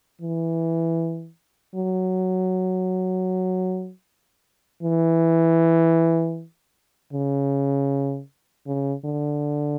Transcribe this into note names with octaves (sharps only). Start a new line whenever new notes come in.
E3
F#3
E3
C#3
C#3
D3